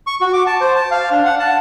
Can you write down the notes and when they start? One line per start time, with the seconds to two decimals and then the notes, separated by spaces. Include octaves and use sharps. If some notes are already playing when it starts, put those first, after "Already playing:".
0.07 C#6
0.21 F#4
0.33 D6
0.47 A5
0.61 C5
0.76 A5
0.91 F5
1.11 D4
1.25 F#5
1.40 A5